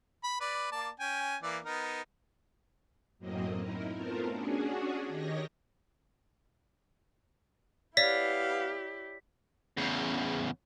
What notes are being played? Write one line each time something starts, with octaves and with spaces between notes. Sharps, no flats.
B5
B4 D5
A#3 D5 A5
C#4 G5 G#5
E3 A#3 D5
B3 D#4 A#4
F#2 A2 F#3 A#3 C4 D#5
D#4 E4 A#4
A3 B3 C4 F4 A4 A#4
C#4 D4 F#4 G#4
D#3 G4 C#5 D#5 A#6
B3 E4 G4 C#5 D5 F5 B6
E2 C#3